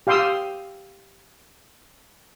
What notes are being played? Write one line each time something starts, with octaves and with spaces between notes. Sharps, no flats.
G4 F5 G5 C6 D#6 E6